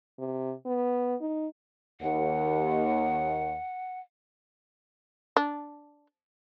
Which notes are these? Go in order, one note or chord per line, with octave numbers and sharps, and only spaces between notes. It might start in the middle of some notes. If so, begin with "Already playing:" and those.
C3
B3
D#4
D#2 F#5
D4